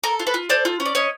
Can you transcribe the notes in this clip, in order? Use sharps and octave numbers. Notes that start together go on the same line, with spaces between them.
A4 A#4
F4
A4 B4
F4
A4 C5 D5
F4
C#4
D5
C#4 C#5 D#5